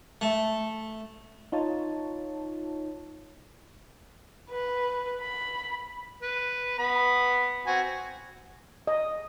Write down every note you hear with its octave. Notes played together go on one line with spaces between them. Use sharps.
A3
D#4 F4 C#5 A5
B4
B5
B4
B3 B5
C4 F#4 G#5
D#5